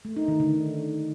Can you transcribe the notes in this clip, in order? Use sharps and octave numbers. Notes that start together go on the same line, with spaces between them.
A3
D#4
D#3
D3